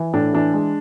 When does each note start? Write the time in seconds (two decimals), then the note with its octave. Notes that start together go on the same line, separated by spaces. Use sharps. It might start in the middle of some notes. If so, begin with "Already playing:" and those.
Already playing: E3
0.13 A2 D4
0.33 E3 D4
0.54 G#3